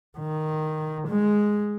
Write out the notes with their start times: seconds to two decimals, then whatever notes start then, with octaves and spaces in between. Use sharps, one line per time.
0.18 D#3
1.08 G#3